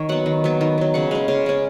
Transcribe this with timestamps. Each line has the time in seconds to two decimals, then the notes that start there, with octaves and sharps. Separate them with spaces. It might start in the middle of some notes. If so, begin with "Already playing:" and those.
Already playing: D#3 C#5
0.09 F#3 B3 F#5
0.26 D#3
0.44 F#3 B3
0.61 D#3
0.78 F#3 B3
0.94 C#3 F#5
1.11 G#3 C#4 F5
1.28 C#3 F5
1.46 G#3 C#4